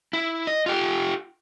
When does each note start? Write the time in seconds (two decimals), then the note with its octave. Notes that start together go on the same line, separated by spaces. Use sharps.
0.13 E4
0.47 D#5
0.66 F4 G4